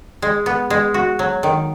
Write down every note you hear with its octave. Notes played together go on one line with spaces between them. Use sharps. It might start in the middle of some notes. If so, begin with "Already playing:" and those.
G#3
B3
G#3
F#4
F#3
D#3